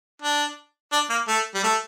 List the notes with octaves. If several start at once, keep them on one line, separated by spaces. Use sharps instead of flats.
D4
D4
A#3
A3
G3
A3